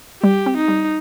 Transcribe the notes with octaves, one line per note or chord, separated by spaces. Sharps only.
G3 G4
C4
D#4
G3